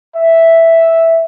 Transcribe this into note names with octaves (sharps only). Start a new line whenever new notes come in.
E5